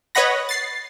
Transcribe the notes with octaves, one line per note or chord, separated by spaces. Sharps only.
B4 C#5 D#5 F#5 B5 A#6
A6 C7